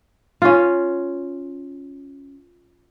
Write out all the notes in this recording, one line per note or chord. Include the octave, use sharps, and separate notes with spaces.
C#4 F4